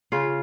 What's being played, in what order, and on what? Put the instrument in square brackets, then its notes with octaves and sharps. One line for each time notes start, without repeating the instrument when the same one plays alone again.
[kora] C#3 F4